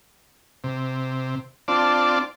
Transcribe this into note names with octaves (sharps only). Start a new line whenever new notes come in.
C3
C4 D4 F4 D5 A5